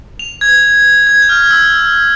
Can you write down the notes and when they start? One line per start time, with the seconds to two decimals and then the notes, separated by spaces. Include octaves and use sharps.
0.19 F7
0.41 G#6
1.07 G#6
1.22 G6
1.29 F6
1.50 E6